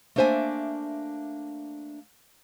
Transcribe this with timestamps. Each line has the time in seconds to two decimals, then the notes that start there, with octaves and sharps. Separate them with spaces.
0.16 A3 A#3 D4 C5 E5 G#5